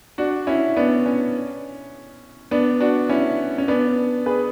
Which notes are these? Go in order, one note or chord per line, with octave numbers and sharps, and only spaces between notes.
D4 F#4
C#4 E4
B3 D4
C#4
B3 D4
D4 F#4
C#4 E4
C#4
B3 D4
G#4 B4